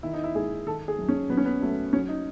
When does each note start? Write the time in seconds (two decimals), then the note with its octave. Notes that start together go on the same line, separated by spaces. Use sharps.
0.03 D#3 E4
0.13 D#4
0.24 E4
0.35 G#2 G#4
0.66 D#3 A4
0.88 G#4
0.99 F#2
1.09 C#4
1.30 F#3 B3
1.37 C#4
1.45 B3
1.61 F#3 A3
1.93 F#3 C#4
2.09 D#4